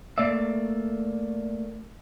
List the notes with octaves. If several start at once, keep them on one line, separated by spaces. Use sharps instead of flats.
A3 A#3 D5 E5